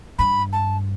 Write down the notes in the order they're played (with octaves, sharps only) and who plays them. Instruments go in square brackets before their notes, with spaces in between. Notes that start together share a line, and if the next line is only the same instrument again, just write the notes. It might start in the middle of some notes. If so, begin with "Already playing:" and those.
[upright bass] G2 [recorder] B5
[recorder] A5